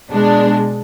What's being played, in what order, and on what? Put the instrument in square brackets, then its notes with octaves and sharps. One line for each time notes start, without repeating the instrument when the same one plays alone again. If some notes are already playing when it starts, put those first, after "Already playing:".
[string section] B2 G#3 D4